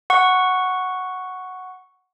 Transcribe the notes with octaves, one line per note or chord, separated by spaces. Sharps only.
F#5 C#6